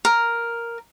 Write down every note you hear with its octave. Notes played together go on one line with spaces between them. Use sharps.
A#4